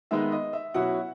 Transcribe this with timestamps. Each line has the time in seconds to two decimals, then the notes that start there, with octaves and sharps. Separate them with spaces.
0.11 D#3 G#3 B3 D#4 E5
0.32 D#5
0.53 E5
0.74 B2 F#3 C#4 E4 F#5